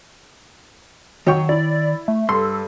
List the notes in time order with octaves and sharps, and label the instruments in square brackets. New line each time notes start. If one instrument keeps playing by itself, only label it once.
[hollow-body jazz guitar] D#3 C#5 G5 [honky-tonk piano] F#3 C#6
[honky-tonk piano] E4 [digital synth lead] D5
[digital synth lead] A3
[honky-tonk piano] G2 [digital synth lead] A4 [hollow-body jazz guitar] C6